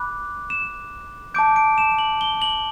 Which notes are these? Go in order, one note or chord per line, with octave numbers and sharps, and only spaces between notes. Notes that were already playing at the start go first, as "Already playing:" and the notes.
Already playing: B5 D6 F#6
E7
A5 D6 G6 D7
D7
E7
F#7
G7
F#7